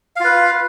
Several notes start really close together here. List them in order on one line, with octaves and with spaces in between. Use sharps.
F5 F4 B4